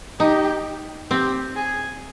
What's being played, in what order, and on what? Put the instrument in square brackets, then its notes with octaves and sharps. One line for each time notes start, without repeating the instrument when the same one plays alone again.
[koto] D#4 [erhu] G4
[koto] C4 [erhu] G4
[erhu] G#4